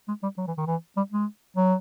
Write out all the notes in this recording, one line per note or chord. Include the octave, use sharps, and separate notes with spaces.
G#3
G3
F#3
E3
D#3
E3
G3
G#3
F#3